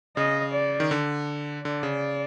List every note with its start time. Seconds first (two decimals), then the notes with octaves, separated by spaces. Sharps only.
0.17 C#3 D#5
0.53 D5
0.80 D#3
0.91 D3
1.64 D3 D5
1.83 C#3